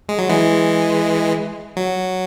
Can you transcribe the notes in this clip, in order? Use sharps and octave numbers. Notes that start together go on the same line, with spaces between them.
G#3
F#3
E3 G#3
F#3